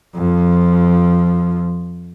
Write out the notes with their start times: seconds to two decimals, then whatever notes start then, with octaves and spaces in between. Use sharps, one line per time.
0.15 F2 F3